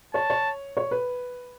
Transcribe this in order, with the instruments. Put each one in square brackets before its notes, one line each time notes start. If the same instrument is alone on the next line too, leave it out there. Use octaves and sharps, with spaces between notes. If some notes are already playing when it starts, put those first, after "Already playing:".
[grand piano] C#5 [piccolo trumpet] A5
[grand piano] C#5
C#5
B4